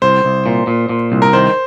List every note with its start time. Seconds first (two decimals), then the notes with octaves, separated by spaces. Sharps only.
0.02 C2 C5
0.25 C2
0.46 A#2
0.67 A#2
0.89 A#2
1.12 C2
1.22 A#4
1.33 D#3 C5